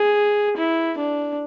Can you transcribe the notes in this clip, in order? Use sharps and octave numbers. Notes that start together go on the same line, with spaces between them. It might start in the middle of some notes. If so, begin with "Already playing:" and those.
Already playing: G#4
E4
D4